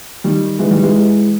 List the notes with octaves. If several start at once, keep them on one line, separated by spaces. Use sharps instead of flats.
D#3 G3
E3 G#3
D#3 G3
E3 G#3